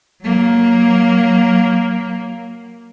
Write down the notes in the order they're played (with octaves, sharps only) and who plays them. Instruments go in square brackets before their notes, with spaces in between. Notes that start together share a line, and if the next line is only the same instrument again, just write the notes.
[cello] F#3 A#3